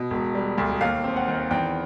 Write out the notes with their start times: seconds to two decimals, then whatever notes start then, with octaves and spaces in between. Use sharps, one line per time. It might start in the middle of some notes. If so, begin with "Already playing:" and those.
Already playing: B2
0.11 E1
0.35 G3
0.58 D2
0.81 D#2 F5
1.04 C4
1.16 F#5
1.28 D#3
1.51 E2 G5